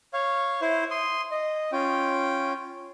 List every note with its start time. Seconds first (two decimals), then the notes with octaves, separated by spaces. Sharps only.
0.13 C#5 F5
0.62 E4 C5
0.91 C6 D#6
1.31 D#5
1.72 C#4 F4 G5